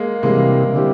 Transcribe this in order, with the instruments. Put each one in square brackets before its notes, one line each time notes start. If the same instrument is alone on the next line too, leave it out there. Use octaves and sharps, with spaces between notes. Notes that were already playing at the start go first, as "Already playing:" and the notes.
Already playing: [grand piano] G#3 A#3
[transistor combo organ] C3 E3 G3 [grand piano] G#3 A#3
[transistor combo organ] D3 G3 C4 E4 G4